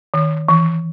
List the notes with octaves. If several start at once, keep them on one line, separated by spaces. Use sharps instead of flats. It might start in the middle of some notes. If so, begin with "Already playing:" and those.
D#3
E3